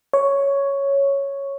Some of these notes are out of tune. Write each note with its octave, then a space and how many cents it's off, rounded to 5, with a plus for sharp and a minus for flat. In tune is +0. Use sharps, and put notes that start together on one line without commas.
C#5 +0